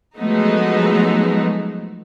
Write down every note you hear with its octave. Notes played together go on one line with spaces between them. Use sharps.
F3 F#3 G#3 A3 B3 D#4